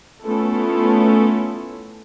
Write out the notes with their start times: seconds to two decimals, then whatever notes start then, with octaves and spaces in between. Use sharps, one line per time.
0.24 A3 B3 C#4 E4 F4 A4